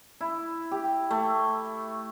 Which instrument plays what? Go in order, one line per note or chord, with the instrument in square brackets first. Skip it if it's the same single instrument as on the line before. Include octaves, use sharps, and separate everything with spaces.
[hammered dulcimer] E4
G4
A3